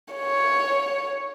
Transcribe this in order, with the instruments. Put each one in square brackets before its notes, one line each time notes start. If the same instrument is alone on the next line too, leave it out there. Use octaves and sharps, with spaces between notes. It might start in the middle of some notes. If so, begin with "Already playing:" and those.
[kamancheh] C#5